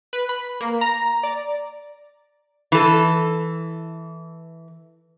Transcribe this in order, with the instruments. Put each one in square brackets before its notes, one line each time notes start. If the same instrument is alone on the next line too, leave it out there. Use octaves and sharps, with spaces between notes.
[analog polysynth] B4
B5
A#3
A#5
D5
[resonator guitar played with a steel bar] E3 A4